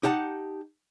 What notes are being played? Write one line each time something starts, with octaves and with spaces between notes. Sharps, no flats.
D#4 G4 F#5 A5